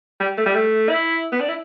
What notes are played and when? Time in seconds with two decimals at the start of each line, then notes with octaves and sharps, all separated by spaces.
0.20 G3
0.37 A3
0.46 G3
0.55 A3
0.89 E4
1.32 B3
1.40 D4
1.49 E4